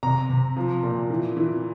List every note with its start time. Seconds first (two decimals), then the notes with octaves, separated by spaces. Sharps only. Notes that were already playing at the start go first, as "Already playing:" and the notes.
0.03 C3 A#5
0.30 C3
0.57 F3
0.83 A#2
1.10 E3
1.37 E3